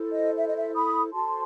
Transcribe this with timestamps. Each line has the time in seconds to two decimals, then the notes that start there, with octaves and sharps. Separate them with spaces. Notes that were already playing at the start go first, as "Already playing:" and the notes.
Already playing: E4 A4 C5
0.12 D#5
0.37 E5
0.46 D#5
0.57 E5
0.75 B5 D#6
1.13 F#4 A4 C5 A5 C6